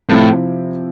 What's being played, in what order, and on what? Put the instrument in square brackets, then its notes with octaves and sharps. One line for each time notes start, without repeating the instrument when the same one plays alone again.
[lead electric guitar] A2 [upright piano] C3 F3 C4 E4